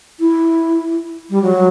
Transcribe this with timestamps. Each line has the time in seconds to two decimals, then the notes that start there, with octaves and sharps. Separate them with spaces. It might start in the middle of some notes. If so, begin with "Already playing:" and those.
0.19 E4
1.30 G3
1.42 F#3